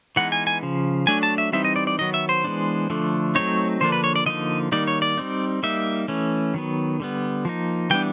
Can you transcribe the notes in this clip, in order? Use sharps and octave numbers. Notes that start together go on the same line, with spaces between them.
E3 G#3 B3 D#4 F#5
G#5
G#5
C#3 F3
F#3 A3 D4 G#5
A5
E5
E3 G3 C4 D#4 E5
D#5
D5
D5
D#3 F#3 B3 D#5
E5
C5
E3 G#3 B3 D4
D3 F3 A3 D4
F#3 A3 C4 D#4 C#5
D3 F3 A#3 D4 C5
B4
C#5
D5
D3 F3 A#3 D#4 D#5
D#3 G3 A#3 D#4 D5
C#5
D5
G3 C4 D#4
G3 A#3 D#4 E5
E3 A3 C#4
D#3 F#3 B3
D3 G3 B3
F3 A#3 D#4
E3 G3 B3 D4 G5